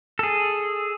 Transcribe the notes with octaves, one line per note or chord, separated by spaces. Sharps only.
G#4 A4